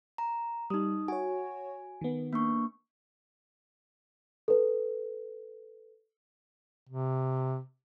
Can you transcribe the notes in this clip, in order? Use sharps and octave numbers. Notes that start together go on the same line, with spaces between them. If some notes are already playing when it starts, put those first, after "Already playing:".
A#5
G3 D#4 D#6
F#4 C#5 G#5
D#3 B3
A#3 D4 C#6
A4 B4
C3